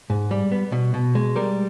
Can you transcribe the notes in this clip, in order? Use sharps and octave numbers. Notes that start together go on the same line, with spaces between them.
G#2
G3
B3
B2
B2
G#3
G3 A#4